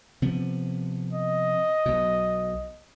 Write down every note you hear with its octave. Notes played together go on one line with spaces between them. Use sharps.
C3 F3 B3
D#5
B1 B2